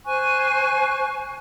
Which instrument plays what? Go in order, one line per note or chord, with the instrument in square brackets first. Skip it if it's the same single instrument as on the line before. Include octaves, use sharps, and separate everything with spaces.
[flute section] C5 G#5 C#6 F#6